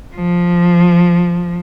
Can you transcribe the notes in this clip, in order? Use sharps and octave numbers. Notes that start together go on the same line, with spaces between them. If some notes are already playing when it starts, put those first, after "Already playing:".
F3